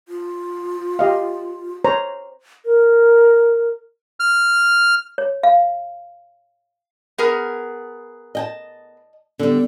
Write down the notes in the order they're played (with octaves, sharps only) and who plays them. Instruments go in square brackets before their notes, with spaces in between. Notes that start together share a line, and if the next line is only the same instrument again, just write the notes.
[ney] F4
[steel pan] G4 D#5 F5
C5 C#5 A#5
[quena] A#4
[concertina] F6
[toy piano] C#5
F5
[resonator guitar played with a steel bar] B3 G#4 A#4
[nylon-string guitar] D#5 G5 A5
[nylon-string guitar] D3 G3 [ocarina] B3